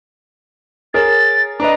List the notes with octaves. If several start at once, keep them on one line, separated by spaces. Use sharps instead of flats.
G#4 A#4 C#5 A6
D4 B4 D#5 A#5